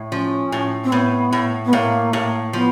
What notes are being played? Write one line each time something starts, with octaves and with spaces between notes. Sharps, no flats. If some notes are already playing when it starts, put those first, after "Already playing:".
Already playing: A2
F3 C#4
A2
C4
A2 B3
A2
B3
A2 A#3
A2
F3 B3